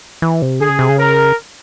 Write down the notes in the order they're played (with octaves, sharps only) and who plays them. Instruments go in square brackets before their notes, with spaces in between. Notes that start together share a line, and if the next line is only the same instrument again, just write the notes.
[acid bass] E3
C3
[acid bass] D3 [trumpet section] G#4
[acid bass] C#3
C3
C#3
[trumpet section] A#4